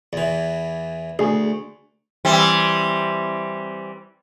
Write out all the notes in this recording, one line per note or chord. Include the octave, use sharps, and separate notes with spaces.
E2 E3
D2 G#4 G#5
E3 G3 C4